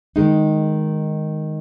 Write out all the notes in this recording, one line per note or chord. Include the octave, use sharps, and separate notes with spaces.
D#3 G#3 D#4